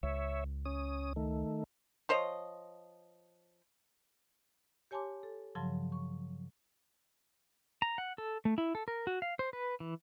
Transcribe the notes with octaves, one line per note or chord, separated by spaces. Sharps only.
C#2 C#5 E5
C#4 D#6
D#3 A3
F3 C5 C#5 D#5
G4 C#5 G#5 A5 C6 D6
A4
G2 C#3 F3 F#3 A5 C6
C#6
A#5
F#5
A4
A3
E4
A4
A#4
F#4
F5
C5
B4
E3